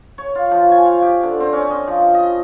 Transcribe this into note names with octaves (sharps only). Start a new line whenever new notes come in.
C#5
F4
F3
G#5
F5
G4
D3
C4
C#4
D#5
F3
D#5